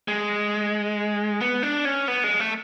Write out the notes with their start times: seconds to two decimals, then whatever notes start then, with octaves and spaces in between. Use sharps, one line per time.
0.08 G#3
1.41 B3
1.63 D4
1.85 C#4
2.08 B3
2.24 G#3
2.40 A3